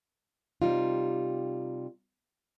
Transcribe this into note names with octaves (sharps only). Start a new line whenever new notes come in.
C3 G3 D#4 F4